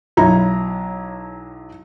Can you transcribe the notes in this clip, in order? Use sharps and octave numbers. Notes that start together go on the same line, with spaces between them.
B1 F#3 E4 A#5